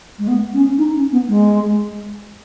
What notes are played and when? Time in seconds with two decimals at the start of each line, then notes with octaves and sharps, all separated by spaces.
0.19 G#3
0.28 B3
0.54 C#4
0.78 D#4
0.95 C#4
1.12 B3
1.28 G#3